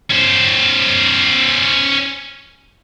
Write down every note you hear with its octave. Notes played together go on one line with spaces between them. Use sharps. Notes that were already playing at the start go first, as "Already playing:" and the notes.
C#4 C5